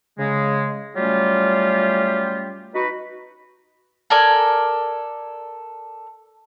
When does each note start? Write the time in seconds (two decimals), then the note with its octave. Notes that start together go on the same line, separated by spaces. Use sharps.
0.18 C#3 G#3
0.95 F#3 G3 A3 C#4 F4 G4
2.74 D#4 F#4 B4
4.10 A4 A#4 D5 G#5